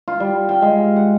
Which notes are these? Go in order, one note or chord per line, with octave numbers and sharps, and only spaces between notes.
F4
G3
G5
G#3
F#5